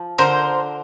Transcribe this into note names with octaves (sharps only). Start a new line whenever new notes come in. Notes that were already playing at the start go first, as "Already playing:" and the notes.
Already playing: F3
D3 A#4 C5